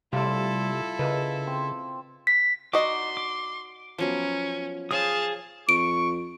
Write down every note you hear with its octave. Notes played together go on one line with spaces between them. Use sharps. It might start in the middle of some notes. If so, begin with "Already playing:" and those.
C3 G3 A3 E4 F4 G4 A4
C#3 A#4 B4 D#5
C4
B6
D#4 F#4 D5 D#5 C6 D6
D6
F3 F#3 B3 C#4
G#4 C5 C#5 F5 A5 D#6
F2 C#6 D7